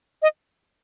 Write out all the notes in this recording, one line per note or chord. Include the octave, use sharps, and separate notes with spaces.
D#5